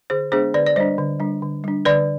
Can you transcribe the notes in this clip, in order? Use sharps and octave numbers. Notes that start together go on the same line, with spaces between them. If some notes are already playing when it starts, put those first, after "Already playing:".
D3 G#4 C5
G#3 B3 D4 G#4 C5
D3 B4 D5
D5
G3 D4 C5 D#5
D3
G3 D4
D3
G3 D4
D3 B4 D5